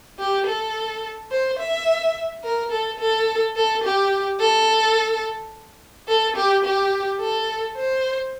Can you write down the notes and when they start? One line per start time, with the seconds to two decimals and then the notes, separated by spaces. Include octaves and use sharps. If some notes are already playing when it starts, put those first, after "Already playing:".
0.19 G4
0.47 A4
1.31 C5
1.59 E5
2.44 A#4
2.71 A4
2.99 A4
3.56 A4
3.84 G4
4.40 A4
6.08 A4
6.36 G4
6.65 G4
7.20 A4
7.76 C5